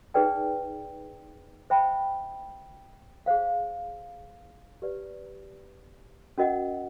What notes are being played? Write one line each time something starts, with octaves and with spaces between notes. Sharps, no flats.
D#4 G#4 B4 D5 G5
C5 E5 G5 B5
G#4 C5 F5
G4 B4 D5
C#4 F#4 A#4 D#5 F#5